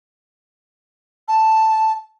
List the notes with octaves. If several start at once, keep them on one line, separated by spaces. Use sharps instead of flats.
A5